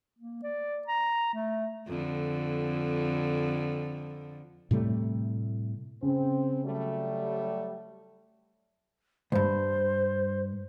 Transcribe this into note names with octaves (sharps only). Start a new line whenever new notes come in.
A#3
D5
A#5
A3
F2 D3
A2 C3 G3 A3
C#3 C4
F#3 G3 A3
C#2 G2 C5